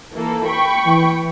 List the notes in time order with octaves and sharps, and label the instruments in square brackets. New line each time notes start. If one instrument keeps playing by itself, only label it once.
[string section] E3 A#3 A4
G5 B5 C#6
[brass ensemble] E3